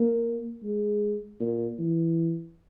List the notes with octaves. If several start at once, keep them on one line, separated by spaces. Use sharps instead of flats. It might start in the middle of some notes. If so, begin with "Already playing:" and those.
Already playing: A#3
G#3
A#2
E3